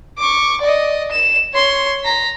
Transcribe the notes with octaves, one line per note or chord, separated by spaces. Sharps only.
C#6 D6
D5 D#5
E7
C#5 C6
A#5 B6